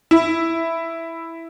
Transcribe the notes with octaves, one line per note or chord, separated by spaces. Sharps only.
E4